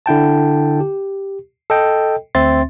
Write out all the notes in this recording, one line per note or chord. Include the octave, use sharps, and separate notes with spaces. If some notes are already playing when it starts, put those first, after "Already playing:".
D3 E4 G5 A5
G4
A4 D#5 G5
D2 C4 E5 C6 A6